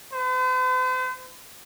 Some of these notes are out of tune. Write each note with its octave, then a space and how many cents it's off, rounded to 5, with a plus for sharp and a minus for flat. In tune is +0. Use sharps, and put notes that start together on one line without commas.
C5 -45